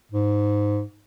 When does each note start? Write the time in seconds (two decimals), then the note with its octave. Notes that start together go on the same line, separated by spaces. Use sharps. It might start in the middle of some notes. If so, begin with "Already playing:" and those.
0.12 G#2